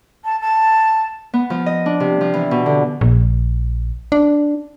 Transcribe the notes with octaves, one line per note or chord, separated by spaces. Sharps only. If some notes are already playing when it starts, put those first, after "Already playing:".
A5
A5
B3
F3
D#5
D4
C3
F3
E3
B2
D3
A#1
D4